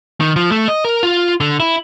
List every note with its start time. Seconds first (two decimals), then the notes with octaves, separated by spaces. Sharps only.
0.20 D#3
0.36 F3
0.51 A3
0.68 D#5
0.85 A#4
1.03 F4
1.40 D3
1.60 E4